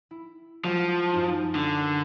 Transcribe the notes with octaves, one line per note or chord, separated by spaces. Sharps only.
E4
F3 F#3 G#3 F4
F#2 D#4
D3
A#4